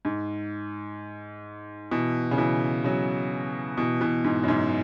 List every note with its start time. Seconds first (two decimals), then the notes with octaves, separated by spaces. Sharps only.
0.05 G#2
1.91 B2 E3
2.31 C#3
2.38 B2 E3
2.84 C#3 F#3
3.78 B2 E3
4.01 B2 E3
4.24 G#2
4.43 F#2
4.48 G#2